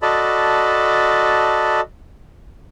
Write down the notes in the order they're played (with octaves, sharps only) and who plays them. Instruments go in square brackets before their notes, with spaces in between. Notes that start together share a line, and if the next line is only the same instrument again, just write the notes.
[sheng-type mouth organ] F#4 A4 D5 D#5 A5 B5